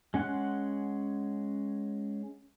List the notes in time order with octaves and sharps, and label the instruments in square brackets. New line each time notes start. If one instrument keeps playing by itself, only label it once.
[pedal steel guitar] G#3 C#4 F#5 C6 F#6